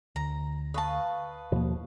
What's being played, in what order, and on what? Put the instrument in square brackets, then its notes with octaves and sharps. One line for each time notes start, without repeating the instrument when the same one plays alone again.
[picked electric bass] D2 [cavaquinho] A#5
[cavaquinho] B4 A5 [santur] D#5 F5 C#6
[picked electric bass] D#2 A#3 [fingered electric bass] B2 F3